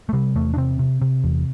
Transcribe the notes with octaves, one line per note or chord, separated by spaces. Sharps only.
A3
C3 G3
E2 A3
D4
C3 C4
C3
C3
E2